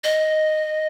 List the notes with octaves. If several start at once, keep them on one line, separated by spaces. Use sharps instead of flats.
D#5